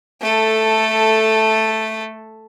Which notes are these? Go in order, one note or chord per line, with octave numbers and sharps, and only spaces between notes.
A3 A4